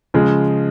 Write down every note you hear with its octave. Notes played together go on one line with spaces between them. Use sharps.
C#3 F3 G#3